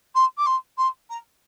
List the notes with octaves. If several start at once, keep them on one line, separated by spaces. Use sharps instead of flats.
C6
D6
C6
C6
A#5